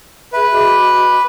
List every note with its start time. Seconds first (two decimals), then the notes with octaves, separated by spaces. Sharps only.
0.33 G#4 B4 E5
0.52 F#4 D#5 D6